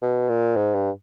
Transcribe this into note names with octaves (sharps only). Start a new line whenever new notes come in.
B2
A#2
G#2
G2